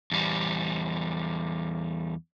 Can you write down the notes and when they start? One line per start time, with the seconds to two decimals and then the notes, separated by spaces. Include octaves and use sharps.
0.12 E2 G3